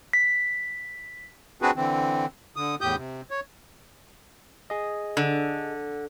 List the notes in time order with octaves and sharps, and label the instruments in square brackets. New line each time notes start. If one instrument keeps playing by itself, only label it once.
[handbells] B6
[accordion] C4 D4 F#4 G#4 B4
D3 E3 C4
D3 D#6
E2 A2 G4 D#6 G6
C3
C#5
[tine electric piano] G#4 D#5
[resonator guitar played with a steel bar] D3